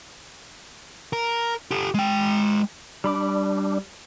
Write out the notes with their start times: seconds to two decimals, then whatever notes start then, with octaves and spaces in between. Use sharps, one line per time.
1.13 A#4
1.71 G4 A4
1.94 G#3 G5
3.04 G3 D4 B5 D6